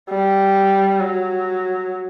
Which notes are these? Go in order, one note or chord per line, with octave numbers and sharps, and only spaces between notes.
G3
F#3